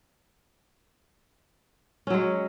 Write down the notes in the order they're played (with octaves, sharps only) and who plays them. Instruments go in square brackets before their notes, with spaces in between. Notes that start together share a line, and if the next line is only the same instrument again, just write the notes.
[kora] C#4
F#3
G#3